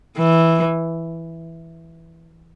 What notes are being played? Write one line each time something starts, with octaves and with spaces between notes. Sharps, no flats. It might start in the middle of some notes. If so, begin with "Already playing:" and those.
E3